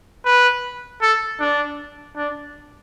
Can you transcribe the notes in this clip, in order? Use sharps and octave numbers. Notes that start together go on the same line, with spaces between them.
B4
A4
D4
D4